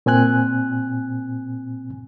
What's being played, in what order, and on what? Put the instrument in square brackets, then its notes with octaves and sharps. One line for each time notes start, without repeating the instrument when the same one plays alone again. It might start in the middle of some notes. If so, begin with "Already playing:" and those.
[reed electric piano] A#2 C4 G#5 F#6